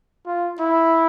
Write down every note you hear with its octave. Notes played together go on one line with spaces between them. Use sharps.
F4
E4